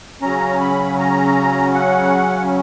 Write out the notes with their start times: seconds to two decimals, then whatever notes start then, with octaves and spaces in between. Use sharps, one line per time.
0.22 C#3 F#3 C#4 A#5
0.61 B5
0.99 A#5
1.75 F#5